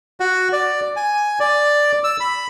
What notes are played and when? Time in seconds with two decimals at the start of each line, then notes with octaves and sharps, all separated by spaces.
0.20 F#4
0.52 D5
0.96 G#5
1.40 D5
2.04 E6
2.20 B5